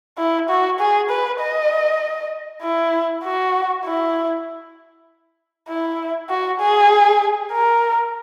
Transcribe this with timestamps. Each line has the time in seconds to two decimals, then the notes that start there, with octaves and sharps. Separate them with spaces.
0.18 E4
0.49 F#4
0.79 G#4
1.10 B4
1.40 D#5
2.62 E4
3.24 F#4
3.85 E4
5.68 E4
6.29 F#4
6.60 G#4
7.52 A#4